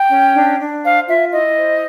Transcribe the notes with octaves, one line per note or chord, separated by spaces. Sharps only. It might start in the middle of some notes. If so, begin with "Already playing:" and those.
Already playing: G5
C#4
D4
D4
C5 F5
F4 E5
E4 D#5
C5